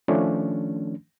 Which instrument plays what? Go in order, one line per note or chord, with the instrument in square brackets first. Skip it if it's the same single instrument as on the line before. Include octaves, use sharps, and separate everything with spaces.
[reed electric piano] D#3 F3 A3 C#4 D4